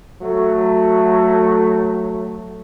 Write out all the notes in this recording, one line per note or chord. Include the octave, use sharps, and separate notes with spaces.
F#3 A3